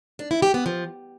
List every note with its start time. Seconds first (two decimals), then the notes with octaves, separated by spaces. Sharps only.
0.19 D4
0.31 E4
0.42 G4
0.54 B3
0.66 F3